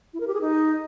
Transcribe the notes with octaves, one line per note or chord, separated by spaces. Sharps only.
E4
A#4
G4
G#4
D#4